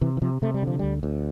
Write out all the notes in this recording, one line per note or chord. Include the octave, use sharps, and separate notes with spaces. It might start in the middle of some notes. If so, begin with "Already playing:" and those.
C3 E3
E3
C3 F3
C3 A3
G3
D3 F3
D2 G3
D2